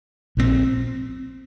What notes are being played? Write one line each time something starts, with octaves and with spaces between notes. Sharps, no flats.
A#1 A#2 F3 C4